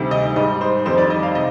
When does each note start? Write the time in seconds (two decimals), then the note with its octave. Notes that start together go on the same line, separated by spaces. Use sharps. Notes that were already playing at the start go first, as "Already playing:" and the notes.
Already playing: D2 C3 D#3 G3
0.11 D#5
0.36 G#2 G3 D#5
0.61 C5
0.86 F2 D#3 G3 C5
0.98 D5
1.10 D#5
1.23 F5
1.35 C3 D#5